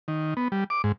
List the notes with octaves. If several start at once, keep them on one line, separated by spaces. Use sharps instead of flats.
D#3
B3
G3
D6
G#2